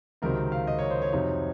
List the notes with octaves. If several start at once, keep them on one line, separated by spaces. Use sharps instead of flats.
C#2 C3 D#3 F#3 C4 A#4
F5
D#5
C#5
C5
C#5
F2 C3 F#3 C4 D#4